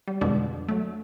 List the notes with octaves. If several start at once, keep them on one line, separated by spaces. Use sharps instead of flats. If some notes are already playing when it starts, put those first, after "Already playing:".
G3
F2 B2 D3 G#3 D4 D5
F#3 A3